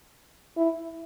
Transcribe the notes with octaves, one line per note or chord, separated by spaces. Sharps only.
E4